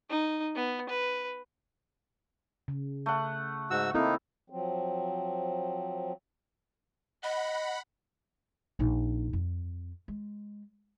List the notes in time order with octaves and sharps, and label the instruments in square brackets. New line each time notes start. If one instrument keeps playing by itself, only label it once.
[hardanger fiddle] D#4
B3
B4
[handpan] C#3
[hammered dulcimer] A3 F#5
[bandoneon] G#2 F#4 E6
[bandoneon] A#3 D#4 [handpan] C4 E4 A4
[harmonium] F3 F#3 C4
[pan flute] D#5 [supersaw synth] F#5 B5
[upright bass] A#1 D#4
F2
G#3